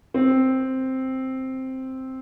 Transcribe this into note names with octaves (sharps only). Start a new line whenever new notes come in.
C4